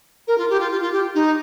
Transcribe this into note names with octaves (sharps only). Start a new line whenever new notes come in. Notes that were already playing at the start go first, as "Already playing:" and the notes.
A#4
F4
G4
F4
F4
F4
G4
D#4